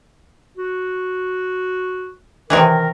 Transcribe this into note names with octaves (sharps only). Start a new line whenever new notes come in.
F#4
C3 D#3 E3 A#4